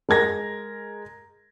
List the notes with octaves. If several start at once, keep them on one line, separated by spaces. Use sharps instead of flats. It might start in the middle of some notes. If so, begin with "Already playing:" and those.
G#3 A#4 G#6 A#6